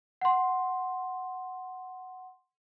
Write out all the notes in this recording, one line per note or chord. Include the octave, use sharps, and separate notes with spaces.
F#5 C6